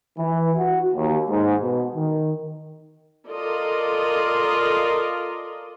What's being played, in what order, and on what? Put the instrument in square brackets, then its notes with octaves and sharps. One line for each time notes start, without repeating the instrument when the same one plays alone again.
[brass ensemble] E3
F#4
D#2
G#2
B2
D#3
[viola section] F4 A4 A#4 D5 D#5